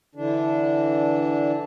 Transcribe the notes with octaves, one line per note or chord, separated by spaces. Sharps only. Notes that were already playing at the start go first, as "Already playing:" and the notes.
D3 E3 D4